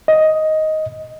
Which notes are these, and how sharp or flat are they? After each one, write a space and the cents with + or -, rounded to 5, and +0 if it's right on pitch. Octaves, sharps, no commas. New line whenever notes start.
D#5 +5